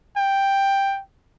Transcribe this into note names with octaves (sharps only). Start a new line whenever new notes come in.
G5